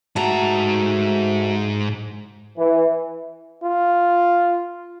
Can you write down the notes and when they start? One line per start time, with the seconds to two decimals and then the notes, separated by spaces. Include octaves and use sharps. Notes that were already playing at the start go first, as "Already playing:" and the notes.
0.16 G#2 A3 F#4 A#5
2.57 E3
3.63 F4